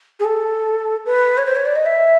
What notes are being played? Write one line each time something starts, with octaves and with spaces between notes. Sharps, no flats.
G#4
A4
B4
C#5
C5
C#5
D5
D#5
E5